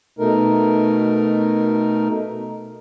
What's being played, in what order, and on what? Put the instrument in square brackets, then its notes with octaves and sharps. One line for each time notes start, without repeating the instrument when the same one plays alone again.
[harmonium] B2 A3 D#4 A#4